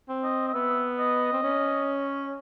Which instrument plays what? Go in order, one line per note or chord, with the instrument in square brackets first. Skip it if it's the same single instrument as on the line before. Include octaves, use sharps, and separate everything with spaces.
[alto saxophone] C4
[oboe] D#5
D#5
[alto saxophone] B3 [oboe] E5
[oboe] D#5
[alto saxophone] C4
C#4